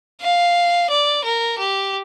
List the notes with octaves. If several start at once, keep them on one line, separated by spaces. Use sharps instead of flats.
F5
D5
A#4
G4